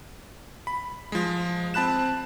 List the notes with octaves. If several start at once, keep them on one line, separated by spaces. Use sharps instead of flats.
B5
F3 G#3
C4 A5 B5 F#6 E7